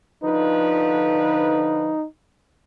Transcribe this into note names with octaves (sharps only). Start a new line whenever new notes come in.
D3 F3 D#4 B4